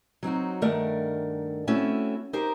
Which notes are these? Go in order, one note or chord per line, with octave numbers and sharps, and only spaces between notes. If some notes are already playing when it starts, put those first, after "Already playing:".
F#3 C4 D#4 F#4
G2 D#3 A3 A#4 D5 F#5
A3 C4 C#4 E4 F#4
D#4 G4 A#4 C5